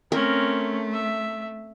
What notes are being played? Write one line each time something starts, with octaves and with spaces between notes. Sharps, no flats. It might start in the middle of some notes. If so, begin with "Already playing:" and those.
A3 C4 C#4 A#4
E5